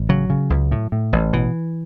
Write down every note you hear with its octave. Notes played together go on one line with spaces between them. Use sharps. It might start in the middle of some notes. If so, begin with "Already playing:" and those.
Already playing: A1
C#3 F#3
C#3
C#2
A2
A2
A1
B2 E3